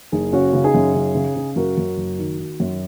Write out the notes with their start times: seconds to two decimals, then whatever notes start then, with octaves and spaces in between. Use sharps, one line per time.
0.12 F#1 D#4 G#4
0.32 C#3 C#4 F#4
0.53 C#3
0.64 D#4 G#4
0.74 F#2
0.94 C#3
1.15 C#3
1.36 C#3
1.56 F#2 F#4 A#4
1.77 F#2
1.97 F#1
2.19 D#3
2.40 D#3
2.60 F#2